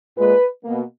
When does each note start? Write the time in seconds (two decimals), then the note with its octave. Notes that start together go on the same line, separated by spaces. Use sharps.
0.17 A#2 G#3 B4
0.64 B2 A#3